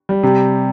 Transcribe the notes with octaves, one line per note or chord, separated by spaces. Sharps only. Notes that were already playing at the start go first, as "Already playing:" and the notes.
G3
C3